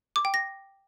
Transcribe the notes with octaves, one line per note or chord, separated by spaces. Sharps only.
D6
G5
A#6